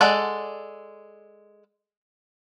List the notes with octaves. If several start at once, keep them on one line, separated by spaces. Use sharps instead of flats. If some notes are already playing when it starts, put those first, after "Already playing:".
G#3 A4 D5 F#5